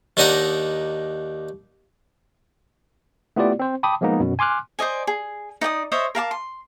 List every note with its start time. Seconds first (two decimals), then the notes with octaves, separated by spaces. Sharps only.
0.17 D#2 D4 D#4 D#5 F#5 A#5
3.36 A3 B3 E4 F4 G4 D5
3.59 C4 C5
3.83 G5 A5 B5 D6 D#6
4.01 F3 G#3 A#3 B3 D#4
4.20 F#2 B2
4.39 G#5 C6 D6 F6 F#6
4.79 C5 D5 D#5 G#5
5.07 G#4
5.61 D#4 D5 G5 D#6
5.92 C5 C#5 D#5 E5
6.15 A#4 F5 A5 D6
6.31 C6